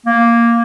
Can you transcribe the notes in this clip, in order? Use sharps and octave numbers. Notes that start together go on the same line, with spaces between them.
A#3